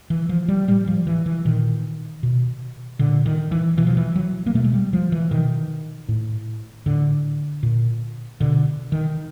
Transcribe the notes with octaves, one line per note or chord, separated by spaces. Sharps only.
E3
F3
G3
A2 G3
F3
E3
E3
A#2 D#3
B2
A#2 D3
D#3
E3
B2 E3
F3
E3
F#3
A#3
B2 A3
G#3
G3
F3
E3
B2 D#3
A2
A2 D3
A#2
B2 D3
D#3